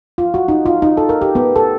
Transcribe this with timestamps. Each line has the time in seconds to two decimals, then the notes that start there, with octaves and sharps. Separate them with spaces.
0.18 F4
0.34 F#4
0.48 D#4
0.66 F4
0.82 D#4
0.97 A4
1.09 A#4
1.22 G4
1.35 B3
1.56 A4